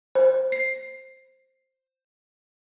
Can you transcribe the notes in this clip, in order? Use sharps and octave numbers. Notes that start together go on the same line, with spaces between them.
C5
C7